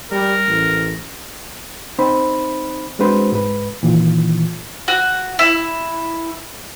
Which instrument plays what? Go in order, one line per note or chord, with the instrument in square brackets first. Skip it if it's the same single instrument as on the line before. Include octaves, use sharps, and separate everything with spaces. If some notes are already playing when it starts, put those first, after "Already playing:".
[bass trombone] G3 [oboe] A#4
[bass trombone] A1
[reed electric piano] C4 D#4 C5 B5
G#3 C4 D4 F#4 B4 C5
G#2 B4
A#2 D#3 E3 F4
[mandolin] F#4
E4